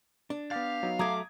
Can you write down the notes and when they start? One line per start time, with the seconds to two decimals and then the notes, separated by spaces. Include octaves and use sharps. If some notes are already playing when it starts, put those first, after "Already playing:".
0.30 D4
0.51 B3 G4 F5 A6
0.83 F#3 B3 D#4
0.99 F#3 A3 A#5 D6 D#6 G#6